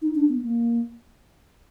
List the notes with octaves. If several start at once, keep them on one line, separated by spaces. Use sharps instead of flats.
D#4
D4
B3
A#3